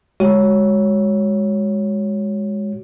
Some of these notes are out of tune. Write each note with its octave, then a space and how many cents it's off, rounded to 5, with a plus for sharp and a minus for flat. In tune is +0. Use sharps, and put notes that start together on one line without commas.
G#3 -15 F#4 +5 C#5 +0